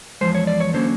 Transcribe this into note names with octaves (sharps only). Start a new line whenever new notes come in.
E2 C3 F3 G#3 C5
C#5
D5
C#5
D3 F#3 A#3 C#4 C5